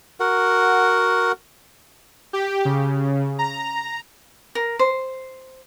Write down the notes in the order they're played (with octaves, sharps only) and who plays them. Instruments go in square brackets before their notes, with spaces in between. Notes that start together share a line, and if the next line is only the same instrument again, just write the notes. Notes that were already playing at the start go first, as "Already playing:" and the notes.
[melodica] F#4 A#4 F#5
[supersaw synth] G4
C#3
A#5
[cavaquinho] A#4
C5